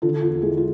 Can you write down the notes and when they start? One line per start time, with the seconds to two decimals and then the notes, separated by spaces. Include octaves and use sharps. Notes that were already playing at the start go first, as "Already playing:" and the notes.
0.02 D3 F4 A4
0.22 E2 F4
0.42 G#3 E4 G#4
0.58 F4